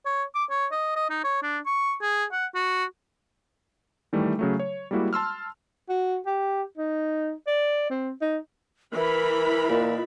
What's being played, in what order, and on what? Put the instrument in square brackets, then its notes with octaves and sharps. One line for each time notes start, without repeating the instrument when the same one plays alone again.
[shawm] C#5
D6
C#5
D#5
D#5
D#4
C#5
D4
C#6
G#4
F#5
F#4
[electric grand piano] D#3 E3 G3 A3
C#3 F#3 A3
C#5
G3 G#3 A#3 E4 F#4
A5 C6 E6 F6
[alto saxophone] F#4
G4
D#4
D5
C4
D#4
[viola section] E3 B5 [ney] A#4
[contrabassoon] A#2 [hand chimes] F4 D#5